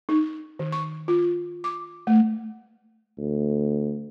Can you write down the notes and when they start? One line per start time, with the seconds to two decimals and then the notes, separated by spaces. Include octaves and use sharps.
0.09 D#4
0.59 D#3
0.72 C#6
1.08 F4
1.64 D6
2.07 A3
3.18 D2